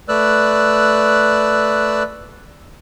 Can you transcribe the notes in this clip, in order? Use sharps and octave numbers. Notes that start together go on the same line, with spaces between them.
A3 B4 D5 E6 F#6